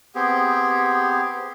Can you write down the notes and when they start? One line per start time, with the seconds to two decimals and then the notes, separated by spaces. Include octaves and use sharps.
0.15 B3 C4 G4 G#4